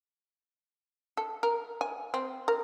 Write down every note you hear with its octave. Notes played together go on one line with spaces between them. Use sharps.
A4
A#4
G#5
C4
A#4